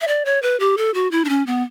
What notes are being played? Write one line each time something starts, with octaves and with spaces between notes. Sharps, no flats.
E5
D5
C#5
B4
G4
A4
F#4
E4
D4
C#4
B3